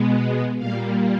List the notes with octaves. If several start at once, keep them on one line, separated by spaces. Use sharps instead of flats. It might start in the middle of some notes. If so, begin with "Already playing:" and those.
Already playing: B2 G#3 B3
A#2 G3 A#3 F5